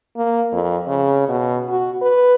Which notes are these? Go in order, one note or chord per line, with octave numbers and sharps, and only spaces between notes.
A#3
F2
C#3
B2
F#4
B4